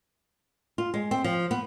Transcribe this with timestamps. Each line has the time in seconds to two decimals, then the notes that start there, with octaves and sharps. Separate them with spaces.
0.78 F4
0.94 G#3
1.11 C4
1.24 F3
1.51 B3